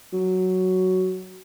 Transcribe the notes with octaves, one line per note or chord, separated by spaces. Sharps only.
F#3